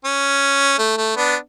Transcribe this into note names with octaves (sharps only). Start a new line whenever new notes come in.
C#4
A3
A3
B3 D4